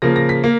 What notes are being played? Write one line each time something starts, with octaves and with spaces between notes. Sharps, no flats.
C#3 F3 A#3 A#6
A#6
B6
A#3